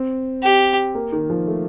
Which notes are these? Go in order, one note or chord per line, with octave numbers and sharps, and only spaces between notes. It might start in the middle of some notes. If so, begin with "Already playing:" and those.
Already playing: C4
G4
A#3
D#3
F3
A3